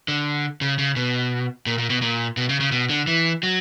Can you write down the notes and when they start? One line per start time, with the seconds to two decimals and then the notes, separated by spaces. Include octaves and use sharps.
0.08 D3
0.61 C#3
0.78 C#3
0.96 B2
1.66 A#2
1.78 A#2
1.90 B2
2.02 A#2
2.37 B2
2.49 C#3
2.60 C#3
2.72 B2
2.89 D3
3.07 E3
3.43 F#3